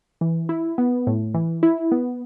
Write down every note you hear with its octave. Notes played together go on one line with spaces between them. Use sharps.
E3
E4
B3
A2
E3
E4
B3